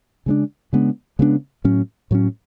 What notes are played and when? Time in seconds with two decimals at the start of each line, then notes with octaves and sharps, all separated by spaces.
0.26 C#3 G#3 B3 D4
0.73 C#3 G#3 B3 D4
1.19 C#3 G#3 B3 D4
1.64 A2 F#3 C#4
2.11 A2 F#3 C#4